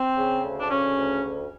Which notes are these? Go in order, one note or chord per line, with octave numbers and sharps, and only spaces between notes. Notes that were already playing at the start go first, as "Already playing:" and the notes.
Already playing: C4
C#3
D2
D4
C#3 C#4
D2
D2